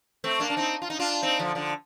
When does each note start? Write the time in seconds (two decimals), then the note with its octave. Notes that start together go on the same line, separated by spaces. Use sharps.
0.24 A3 C4
0.40 A#3 D4
0.50 D4
0.57 C4 D#4
0.82 F4
0.90 D#4
0.99 D4 F4
1.23 C4 D#4
1.39 D3 F3
1.55 D3 F3